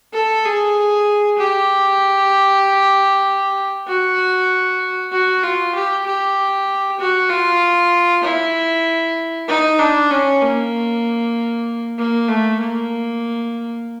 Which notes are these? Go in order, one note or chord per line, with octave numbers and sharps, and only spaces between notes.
A4
G#4
G4
F#4
F#4
F4
G4
G4
F#4
F4
E4
D#4
D4
C#4
A#3
A#3
A3
A#3